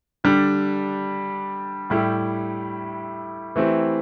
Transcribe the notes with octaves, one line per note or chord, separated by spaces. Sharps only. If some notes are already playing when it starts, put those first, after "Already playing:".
D3 G3 D4 G4
A2 G3 E4 G4
E3 A3 C4 E4 G4